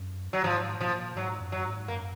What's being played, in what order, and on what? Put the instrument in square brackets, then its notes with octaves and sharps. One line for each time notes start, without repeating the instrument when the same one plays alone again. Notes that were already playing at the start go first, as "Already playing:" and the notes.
Already playing: [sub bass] F#2
[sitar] F#3
[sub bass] G#2 [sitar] F3
[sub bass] A#2 [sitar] F3
[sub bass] G#2 [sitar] F#3
[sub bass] F#2
[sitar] F#3
[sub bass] G#2
[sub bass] F#2 [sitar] A#3